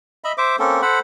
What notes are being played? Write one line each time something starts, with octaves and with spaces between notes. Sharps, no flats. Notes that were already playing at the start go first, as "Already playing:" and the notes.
D#5 E5 B5
C5 E5 D6
A#3 C4 C#4 A4
A4 C5 F#5 B5